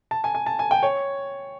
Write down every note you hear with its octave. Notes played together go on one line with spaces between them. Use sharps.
A5
G#5
G#5
A5
G#5
G5
C#5